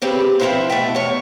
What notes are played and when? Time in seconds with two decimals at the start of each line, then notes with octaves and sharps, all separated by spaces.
0.02 C#3 C4 G4 G#4 B4
0.40 F3 C4 C#4 E4 B4 C5
0.70 B2 A3 E5 G5
0.95 E2 C#5